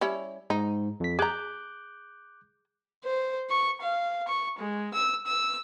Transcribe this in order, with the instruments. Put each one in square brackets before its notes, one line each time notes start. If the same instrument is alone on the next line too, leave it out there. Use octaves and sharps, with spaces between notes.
[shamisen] G3 C#4 E4
[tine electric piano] G#2 [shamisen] D#4
[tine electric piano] F2 B6
[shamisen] G#4 A#5 [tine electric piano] D6 F#6 G6
[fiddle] C5
C#6
F5
C#6
G#3
E6
E6